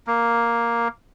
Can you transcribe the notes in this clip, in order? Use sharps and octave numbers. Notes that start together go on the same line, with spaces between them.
A#3